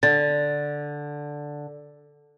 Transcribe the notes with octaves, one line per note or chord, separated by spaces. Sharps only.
D3 A6